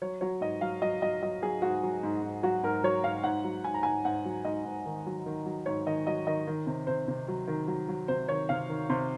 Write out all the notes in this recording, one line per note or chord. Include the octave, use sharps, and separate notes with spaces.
F#3 C#5
F#3 C#5
G#2 D#5
F#3 F5
F#3 D#5
F#3 D#5
F#3 D#5
F#3 G#4
G#2 F#4
F#3
G#2
G#2
F#3 F#4
G#2 A#4
F#3 C#5
G#2 F5
G#2 F#5
F#3
G#2 G#5
A#5
G#2 G#5
G#2 F#5
F#3
G#2 D#5
G#2
D#3
F#3
D#3
F#3
G#2 C#5
D#3 D#5
F#3 D#5
D#3 D#5
D#3
C3
C3 C5
C3
F#3
D#3
F#3
F#3
C3 C5
D#3 C#5
C3 F5
D#3
C3 C6